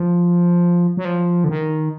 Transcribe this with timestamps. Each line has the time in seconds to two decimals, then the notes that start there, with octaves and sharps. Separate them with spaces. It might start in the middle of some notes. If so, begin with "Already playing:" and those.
Already playing: F3
0.97 F#3
1.05 F3
1.44 D3
1.49 D#3